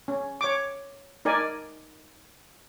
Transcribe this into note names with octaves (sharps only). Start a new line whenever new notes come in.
C#4
C#5 D6
D#4 A#4 D5 G#5